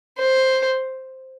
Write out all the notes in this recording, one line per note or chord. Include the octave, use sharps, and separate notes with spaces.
C5